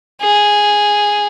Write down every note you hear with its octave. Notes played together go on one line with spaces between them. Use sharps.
G#4